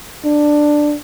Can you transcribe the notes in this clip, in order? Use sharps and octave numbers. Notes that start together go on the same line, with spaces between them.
D4